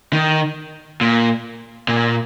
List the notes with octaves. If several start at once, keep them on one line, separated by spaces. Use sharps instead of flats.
D#3
A#2
A#2